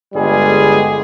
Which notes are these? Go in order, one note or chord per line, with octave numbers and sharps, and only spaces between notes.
G1 G3 G#3 G#4